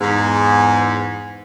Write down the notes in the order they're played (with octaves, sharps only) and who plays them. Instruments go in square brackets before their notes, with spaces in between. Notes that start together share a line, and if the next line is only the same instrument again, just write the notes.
[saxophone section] E2 G#2